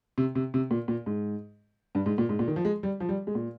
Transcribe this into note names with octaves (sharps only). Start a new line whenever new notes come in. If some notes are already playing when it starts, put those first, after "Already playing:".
C3
C3
C3
A#2
A#2
G#2
G2
G#2
A#2
G#2
A#2
D#3
F3
G#3
G3
F3
G3
G#3
A#2